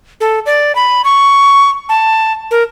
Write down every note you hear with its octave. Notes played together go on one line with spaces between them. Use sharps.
A4
D5
B5
C#6
A5
A#4